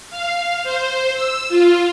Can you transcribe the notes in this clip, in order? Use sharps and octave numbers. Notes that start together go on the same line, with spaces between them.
F5
C5
E6
F4